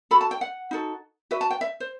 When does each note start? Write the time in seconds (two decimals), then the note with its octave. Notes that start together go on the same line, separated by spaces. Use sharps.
0.11 F#4 A4 B5
0.21 A5
0.31 G5
0.41 F#5
0.71 D#4 F#4 A4
1.31 F#4 B4 E5
1.41 A5
1.51 G5
1.61 E5
1.80 C5